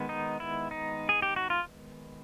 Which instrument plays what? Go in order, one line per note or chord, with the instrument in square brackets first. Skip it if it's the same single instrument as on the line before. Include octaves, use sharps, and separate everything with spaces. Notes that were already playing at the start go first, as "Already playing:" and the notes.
Already playing: [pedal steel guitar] D#3 G#3 B3
D#4
E4
D#4
G#4
G4
F#4
F4